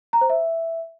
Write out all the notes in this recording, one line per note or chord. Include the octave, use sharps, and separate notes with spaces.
A#5
C5
E5